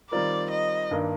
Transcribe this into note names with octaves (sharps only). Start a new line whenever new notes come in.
D#3 G3 C4 F4 A#4 D5
D#5
G2 D#3 A#3 D4